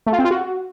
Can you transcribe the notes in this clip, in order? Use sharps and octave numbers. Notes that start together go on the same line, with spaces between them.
A3
F4
C4
F4
F#4